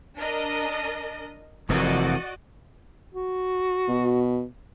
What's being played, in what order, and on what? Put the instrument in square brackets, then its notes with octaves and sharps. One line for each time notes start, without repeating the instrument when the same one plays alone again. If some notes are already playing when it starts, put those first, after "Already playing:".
[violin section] D4 A#4 D#5
[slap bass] F1 F2 [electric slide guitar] E3 C4 A#4 [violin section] F#4 D5 D#5
[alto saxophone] F#4
[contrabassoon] B2